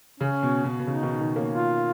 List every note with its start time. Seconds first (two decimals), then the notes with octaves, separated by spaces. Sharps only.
0.20 C#3 C#4
0.43 B2
0.65 B2
0.80 B2
0.87 C#3 D#4
1.03 B2 D#3
1.19 B2 D#3
1.36 A#3 C#4
1.52 F4